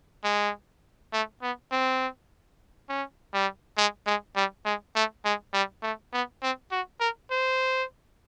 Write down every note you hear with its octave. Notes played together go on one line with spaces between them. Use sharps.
G#3
A3
B3
C4
C#4
G3
G#3
G#3
G3
G#3
A3
G#3
G3
A3
B3
C4
F#4
A#4
C5